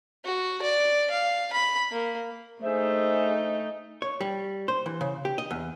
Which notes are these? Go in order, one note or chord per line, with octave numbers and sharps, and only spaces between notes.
F#4
D5
F5
B5
A#3
A3 D#4 G#4 C5 E5
C#5
G3
C5
E3
C#3
G4
D#5
E2